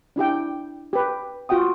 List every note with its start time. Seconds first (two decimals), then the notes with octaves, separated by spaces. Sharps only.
0.16 D4 E4 G4 G5
0.93 G4 B4
1.49 F4 F#4 F#5 G5 D#6